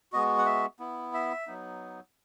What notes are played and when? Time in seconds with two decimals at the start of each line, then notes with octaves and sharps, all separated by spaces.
0.12 G#3 B3 F#4 D#5
0.38 F#5
0.46 E5
0.79 B3 E4
1.14 E5
1.47 F#3 B3 D#4